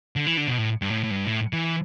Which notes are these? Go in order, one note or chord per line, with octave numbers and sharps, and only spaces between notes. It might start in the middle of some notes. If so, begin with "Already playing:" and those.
D3
E3
D3
B2
A2
G2
A2
A2
G2
A2
E3